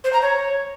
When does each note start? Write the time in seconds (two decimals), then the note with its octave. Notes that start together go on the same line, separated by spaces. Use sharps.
0.04 C5
0.13 A#5
0.22 C#5